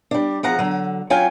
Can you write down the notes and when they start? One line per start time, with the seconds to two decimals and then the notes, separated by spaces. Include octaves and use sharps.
0.11 G3 D4
0.43 E2 F3 F#5 A#5
0.59 D3 F#3
1.10 F#3 C#4 F4 G5 G#5